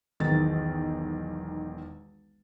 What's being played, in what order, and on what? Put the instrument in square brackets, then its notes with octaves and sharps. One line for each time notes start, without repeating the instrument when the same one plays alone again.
[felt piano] E1 B1 D#3 A6